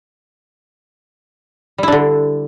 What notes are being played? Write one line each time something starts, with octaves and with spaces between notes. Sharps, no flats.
D3 G3 D4 E4